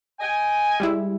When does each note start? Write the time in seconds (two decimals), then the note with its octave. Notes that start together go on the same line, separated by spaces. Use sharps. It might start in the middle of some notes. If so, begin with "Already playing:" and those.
0.20 D#5 G5 G#5
0.80 G3 G#3 E4